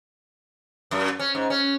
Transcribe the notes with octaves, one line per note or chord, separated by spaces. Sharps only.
F#2
C#4
G#2
C#4